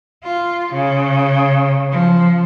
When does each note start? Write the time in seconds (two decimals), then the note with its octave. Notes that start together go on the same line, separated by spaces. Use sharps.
0.23 F4
0.72 C#3
1.91 F3